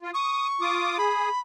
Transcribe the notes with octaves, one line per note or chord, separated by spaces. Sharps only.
F4
C#6 D#6
F4 D6 D#6
G#4 B5